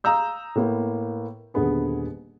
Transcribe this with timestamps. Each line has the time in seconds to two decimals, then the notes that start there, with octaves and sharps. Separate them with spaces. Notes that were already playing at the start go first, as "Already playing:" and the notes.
0.04 F5 A#5 D#6 E6 G6
0.55 A2 A#3 B3
1.54 D#1 D3 B3 G#4